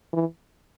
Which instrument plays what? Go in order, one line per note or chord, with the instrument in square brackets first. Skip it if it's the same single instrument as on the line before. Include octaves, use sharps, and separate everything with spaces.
[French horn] E3